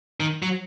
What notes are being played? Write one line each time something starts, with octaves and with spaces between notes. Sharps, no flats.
D#3
F#3